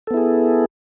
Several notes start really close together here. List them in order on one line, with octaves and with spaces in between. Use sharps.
A4 B3 E4 G#4